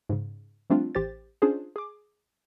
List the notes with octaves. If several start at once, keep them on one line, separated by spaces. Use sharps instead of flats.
G#2 C#3
F3 G3 A3 C4 D4 F4
A1 G4 C5 A6
C#4 D4 F4 G#4 C5
G#4 D6